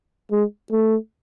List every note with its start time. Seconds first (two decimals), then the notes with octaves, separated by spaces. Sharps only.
0.31 G#3
0.71 A3